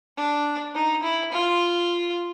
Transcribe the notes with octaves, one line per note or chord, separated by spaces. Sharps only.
D4
D#4
E4
F4